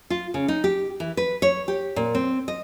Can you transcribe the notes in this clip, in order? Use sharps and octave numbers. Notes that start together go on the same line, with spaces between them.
F4
C#3
D#4
G4
E3
B4
C#5
G4
A#2
C4
D#5